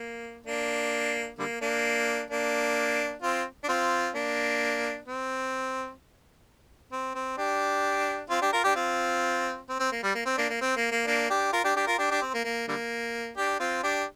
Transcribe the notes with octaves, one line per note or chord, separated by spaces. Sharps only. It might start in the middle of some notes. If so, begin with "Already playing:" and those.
Already playing: A#3
A#3 D4
D3 G3 A#3
A#3 D4
A#3 D4
C4 F4
D4
C4 F4
A#3 D4
C4
C4
C4
D4 G4
C4 F4
D4 G4
F4 A#4
D4 G4
C4 F4
C4
C4
A#3
G3
A#3
C4
A#3 D4
A#3
C4
A#3
A#3
A#3 D4
D4 G4
F4 A#4
D4 G4
D4 G4
F4 A#4
D4 G4
D4 G4
C4
A#3
A#3
D3 G3 A#3
D4 G4
C4 F4
D4 G4